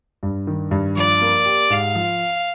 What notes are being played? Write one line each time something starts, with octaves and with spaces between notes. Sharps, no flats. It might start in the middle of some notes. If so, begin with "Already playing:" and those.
G2
D#3
G2
F3 D5
A#3
G4
G#2 F5
F3